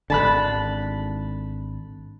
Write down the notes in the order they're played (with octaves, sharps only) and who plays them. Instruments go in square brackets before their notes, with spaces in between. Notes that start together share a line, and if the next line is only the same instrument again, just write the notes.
[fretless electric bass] G#1 D3 [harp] A5 B5 F#6